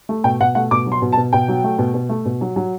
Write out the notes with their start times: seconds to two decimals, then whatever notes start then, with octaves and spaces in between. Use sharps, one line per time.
0.09 A3
0.24 B2 G5
0.40 B2 F#5
0.55 A3 F#5
0.71 B2 D6
0.86 F#3
0.92 C6
1.02 B2
1.13 A5
1.17 B2
1.33 B2 G5
1.48 F#3
1.64 A3
1.79 B2
1.94 B2
2.09 A3
2.25 B2
2.41 F#3
2.56 F#3